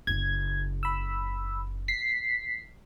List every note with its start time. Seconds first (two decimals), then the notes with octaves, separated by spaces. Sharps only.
0.07 F#1 C#3 G#6
0.83 B5 E6
1.88 B6 C7